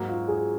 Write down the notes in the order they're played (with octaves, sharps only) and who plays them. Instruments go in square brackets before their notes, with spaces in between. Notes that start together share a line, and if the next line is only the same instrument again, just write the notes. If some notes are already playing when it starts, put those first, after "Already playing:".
Already playing: [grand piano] G#2 F#3 A#3 [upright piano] F#4
[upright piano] F4
G#4